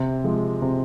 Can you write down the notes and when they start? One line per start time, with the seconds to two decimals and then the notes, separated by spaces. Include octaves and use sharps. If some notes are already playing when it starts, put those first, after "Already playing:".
Already playing: C3
0.24 F3 G#3
0.62 C3